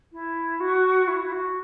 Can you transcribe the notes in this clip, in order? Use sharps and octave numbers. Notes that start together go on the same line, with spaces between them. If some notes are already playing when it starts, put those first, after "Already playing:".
E4
F#4
E4
E4
F#4